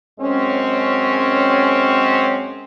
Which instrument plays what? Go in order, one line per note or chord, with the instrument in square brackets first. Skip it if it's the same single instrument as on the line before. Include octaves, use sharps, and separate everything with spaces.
[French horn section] F#2 G#3 C4 C#4